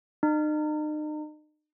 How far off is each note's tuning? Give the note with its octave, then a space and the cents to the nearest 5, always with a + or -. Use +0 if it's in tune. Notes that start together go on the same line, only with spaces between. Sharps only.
D#4 -40